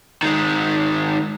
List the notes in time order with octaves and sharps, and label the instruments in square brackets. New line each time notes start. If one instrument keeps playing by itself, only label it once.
[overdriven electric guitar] D#3 G#3